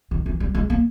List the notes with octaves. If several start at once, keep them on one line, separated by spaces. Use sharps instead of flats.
D#3
E3
G3
G#3
A#3